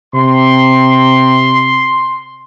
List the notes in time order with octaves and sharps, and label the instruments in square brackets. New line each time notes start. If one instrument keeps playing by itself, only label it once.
[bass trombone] C3 [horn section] C6